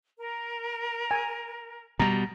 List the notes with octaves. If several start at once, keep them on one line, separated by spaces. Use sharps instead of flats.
A#4
G#5
B2 G3 A#5